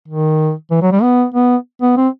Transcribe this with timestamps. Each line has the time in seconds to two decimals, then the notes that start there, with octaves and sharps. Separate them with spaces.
0.08 D#3
0.71 E3
0.82 F#3
0.92 G3
1.02 B3
1.34 B3
1.81 B3
1.97 C4